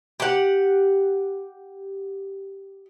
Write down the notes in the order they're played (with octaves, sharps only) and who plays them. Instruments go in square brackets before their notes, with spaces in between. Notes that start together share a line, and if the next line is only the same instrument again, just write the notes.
[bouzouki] G4 F#5